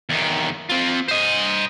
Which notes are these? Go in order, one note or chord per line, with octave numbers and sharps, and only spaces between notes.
E2 D#3
C4 F4
C5 D#5